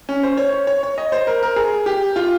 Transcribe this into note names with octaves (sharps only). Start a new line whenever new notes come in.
C#4
C5
C#5
C#5
C#5
C#5
D#5
C5
A#4
A#4
G#4
G4
F4